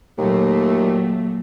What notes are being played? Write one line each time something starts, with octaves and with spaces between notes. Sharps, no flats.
D#2 A#2 F#3 A3